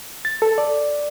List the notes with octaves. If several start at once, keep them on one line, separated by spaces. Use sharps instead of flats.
A6
A4
D5